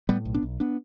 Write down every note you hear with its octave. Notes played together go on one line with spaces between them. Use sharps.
A2 G3 B3
B1
B3 D4
B1
B3 D4